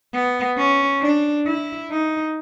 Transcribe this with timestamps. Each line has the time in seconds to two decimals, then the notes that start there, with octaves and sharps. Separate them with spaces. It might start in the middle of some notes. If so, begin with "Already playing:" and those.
0.14 B3
0.58 C#4
1.02 D4
1.47 E4
1.91 D#4